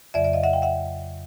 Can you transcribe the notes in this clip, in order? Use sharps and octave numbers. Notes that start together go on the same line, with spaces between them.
F2 C#3 F#3 D5 E5
D5 E5
D#5 F5
E5 F#5
F5 G5
E5 F#5